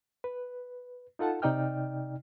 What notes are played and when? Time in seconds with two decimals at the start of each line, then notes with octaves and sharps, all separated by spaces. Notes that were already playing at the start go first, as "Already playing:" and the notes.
0.24 B4
1.19 D#4 F4 A4 F#5 A5
1.42 C3 D#4 D5 D#5 G5 F6